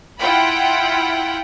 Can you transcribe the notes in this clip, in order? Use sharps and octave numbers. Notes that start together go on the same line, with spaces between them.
E4 F4 F#5 G5 B5